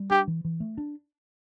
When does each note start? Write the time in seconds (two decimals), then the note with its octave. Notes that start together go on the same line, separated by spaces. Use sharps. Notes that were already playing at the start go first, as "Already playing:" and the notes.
Already playing: G3
0.11 D4 G4
0.28 E3
0.45 E3
0.60 A3
0.78 D4